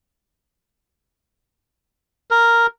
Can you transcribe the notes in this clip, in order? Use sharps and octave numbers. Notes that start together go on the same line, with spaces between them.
A#4